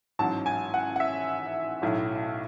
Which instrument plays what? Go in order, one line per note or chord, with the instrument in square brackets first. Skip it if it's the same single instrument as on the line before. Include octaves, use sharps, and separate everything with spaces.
[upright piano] A1 G#2 F#3 A5
G#5
F#5
F#5
E5
B1 A2 F#3